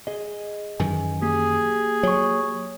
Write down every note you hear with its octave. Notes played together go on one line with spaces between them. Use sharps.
G#4 D#5
F#2 D#3 E3 G#5
A#3 G4 G#4
F#3 C#5 C#6